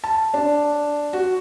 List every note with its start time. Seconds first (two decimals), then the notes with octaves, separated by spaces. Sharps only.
0.04 A5
0.34 D4
1.13 F#4